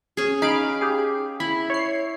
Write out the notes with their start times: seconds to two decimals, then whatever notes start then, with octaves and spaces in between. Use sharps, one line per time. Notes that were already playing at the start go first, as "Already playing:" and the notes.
0.17 C#4 G#4
0.42 D#4 F5 B5 D7
0.81 G4 G#4
1.40 E4 B5
1.70 C#5 C7